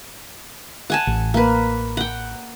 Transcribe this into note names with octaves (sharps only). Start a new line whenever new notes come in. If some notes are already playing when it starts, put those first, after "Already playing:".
F#5 G#5 A5
A1
A#3 B4
F#5 G5